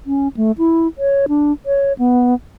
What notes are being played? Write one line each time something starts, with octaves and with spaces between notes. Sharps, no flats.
C#4
A3
E4
C#5
D4
C#5
B3